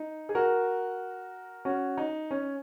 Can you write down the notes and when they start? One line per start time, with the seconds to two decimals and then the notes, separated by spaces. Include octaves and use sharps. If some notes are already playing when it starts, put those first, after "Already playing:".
Already playing: D#4
0.29 G#4
0.35 F#4 A#4
1.65 C#4 F#4
1.97 D#4
2.31 C#4